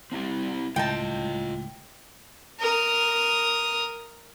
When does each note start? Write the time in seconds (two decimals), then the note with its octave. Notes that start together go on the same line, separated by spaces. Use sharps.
0.12 C4 E4 G4
0.76 C#2 A2 F4 D#5 G5 A5
2.60 A#4 D#6